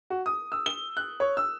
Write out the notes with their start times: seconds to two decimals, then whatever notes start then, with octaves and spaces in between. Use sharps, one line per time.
0.10 F#4
0.26 D#6
0.52 E6
0.66 G7
0.97 F#6
1.20 C#5
1.37 E6